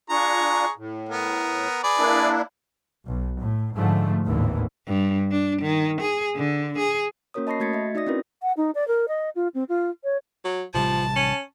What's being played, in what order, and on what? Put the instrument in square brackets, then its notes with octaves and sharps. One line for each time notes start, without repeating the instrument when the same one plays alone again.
[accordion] D4 F4 [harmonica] G#4 A#5 C#6
[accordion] A2
[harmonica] B3 A#4
G#4 B4 D5
[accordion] A#3 D4 E4
[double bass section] B1
A2
G#2 D3 F3 A3
G#1 D#2 A2 D3 E3
[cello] G2
D4
D#3
G#4
D3
G#4
[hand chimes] A#3 C#4 F#4 A#4 C#5 D#6
D#5 A5 B5 C#6 A#6 C7
A3 F#4 G#6 A6 B6 C#7
D#5 E5
D#4 F#4 D5 D#6 A#6
C4 C#4 E4 F#4 A#4 B4
[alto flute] F#5
D#4
D5
A#4
D#5
F4
C4
F4
C#5
[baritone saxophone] F#3
[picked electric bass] A1 C3 G3 [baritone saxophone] F3 [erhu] A5
[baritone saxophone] C#4